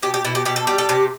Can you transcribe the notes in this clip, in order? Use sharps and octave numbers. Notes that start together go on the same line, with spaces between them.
B2 G4
G4
B2 E4
G4
B2 G4
A4
G3 G4
A4
C3 G4